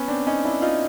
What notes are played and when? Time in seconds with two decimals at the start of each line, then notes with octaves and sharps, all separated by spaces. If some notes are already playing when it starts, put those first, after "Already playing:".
Already playing: B3 C#4
0.08 C4 D4
0.27 C#4 D#4
0.45 D4 E4
0.62 D#4 F4